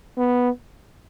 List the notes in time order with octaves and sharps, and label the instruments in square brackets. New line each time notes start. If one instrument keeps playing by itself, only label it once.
[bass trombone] B3